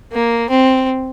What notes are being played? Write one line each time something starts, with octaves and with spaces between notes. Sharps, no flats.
A#3
C4